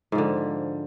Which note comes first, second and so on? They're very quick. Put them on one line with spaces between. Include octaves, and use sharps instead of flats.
G#2 F3 D3